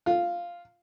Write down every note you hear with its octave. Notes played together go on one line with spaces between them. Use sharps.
F4